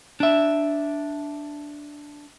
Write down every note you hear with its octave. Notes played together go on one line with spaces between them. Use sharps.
D4 E5